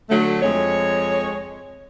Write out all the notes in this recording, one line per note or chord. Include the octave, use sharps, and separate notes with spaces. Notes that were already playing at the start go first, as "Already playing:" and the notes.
D3 F#3 A3
F2 G#3 C#5